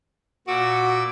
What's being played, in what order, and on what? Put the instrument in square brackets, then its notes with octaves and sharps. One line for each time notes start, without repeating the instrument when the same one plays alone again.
[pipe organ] A#2 D6 E6 [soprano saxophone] F#4